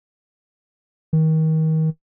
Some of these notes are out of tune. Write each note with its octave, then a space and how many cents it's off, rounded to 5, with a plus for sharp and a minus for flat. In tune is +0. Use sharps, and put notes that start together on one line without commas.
D#3 +30